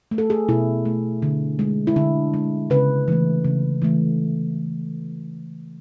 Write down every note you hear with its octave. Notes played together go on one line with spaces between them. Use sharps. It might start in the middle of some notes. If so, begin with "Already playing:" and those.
A3
A4
G#4
B2 E4
A3
D3
G#3
E4
D3 D4
G#3
C#3 B4
E3 A3
C#3
E3 A3